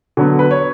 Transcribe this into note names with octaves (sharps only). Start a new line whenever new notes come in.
D3 F#3 B3
B4
C#5